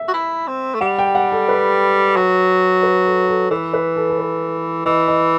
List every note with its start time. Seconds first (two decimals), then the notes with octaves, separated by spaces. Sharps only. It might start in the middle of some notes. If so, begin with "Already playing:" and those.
Already playing: E5
0.08 F#4
0.14 E4
0.47 C4
0.74 A3
0.81 G3 F#5
0.99 G5
1.15 F#5
1.32 A4
1.48 B4
2.16 F#3
2.83 B4
3.06 A4
3.28 A4
3.51 E3 B4
3.73 B4
3.96 A4
4.10 A4
4.19 B4
4.86 E3 D#5
5.08 D#5